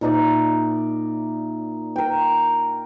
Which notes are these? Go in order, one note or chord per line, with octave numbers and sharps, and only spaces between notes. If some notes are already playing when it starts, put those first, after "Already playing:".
A#2 D#4 D5 E5
A#4 G5